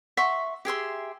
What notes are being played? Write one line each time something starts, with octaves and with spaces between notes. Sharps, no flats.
E5 F#5 C6 C#6
G4 G#4 E5 C6